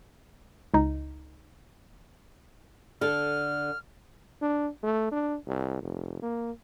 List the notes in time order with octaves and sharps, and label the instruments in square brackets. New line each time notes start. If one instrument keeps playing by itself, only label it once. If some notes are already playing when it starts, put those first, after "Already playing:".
[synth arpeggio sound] C#2 D#4
[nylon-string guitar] D3 A4 [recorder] F6
[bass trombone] D4
A3
D4
C2
F1
A#3